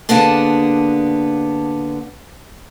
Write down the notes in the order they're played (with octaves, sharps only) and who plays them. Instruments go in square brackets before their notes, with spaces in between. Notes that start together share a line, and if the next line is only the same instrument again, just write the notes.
[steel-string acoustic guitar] D3 A#3 B3 D4 G#4 A5